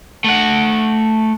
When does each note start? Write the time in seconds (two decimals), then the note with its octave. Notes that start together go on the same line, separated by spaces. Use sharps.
0.24 A3 F#5